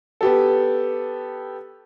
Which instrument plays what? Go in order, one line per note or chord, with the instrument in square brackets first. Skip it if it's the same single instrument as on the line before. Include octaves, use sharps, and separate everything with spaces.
[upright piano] B3 G4 A4